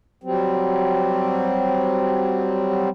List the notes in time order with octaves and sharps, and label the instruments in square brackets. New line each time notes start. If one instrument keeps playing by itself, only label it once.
[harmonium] F#3 G3 C4